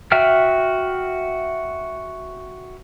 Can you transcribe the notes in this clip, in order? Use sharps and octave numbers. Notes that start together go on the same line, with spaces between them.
F#4 E5 G5 F6